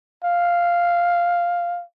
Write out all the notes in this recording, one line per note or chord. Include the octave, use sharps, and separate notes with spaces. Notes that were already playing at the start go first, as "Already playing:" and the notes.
F5